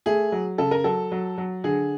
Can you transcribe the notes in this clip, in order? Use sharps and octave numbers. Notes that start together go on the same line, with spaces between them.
A3 G#4
F#3
C#3 A4
A#4
F#3 A4
F#3
F#3
D3 G#4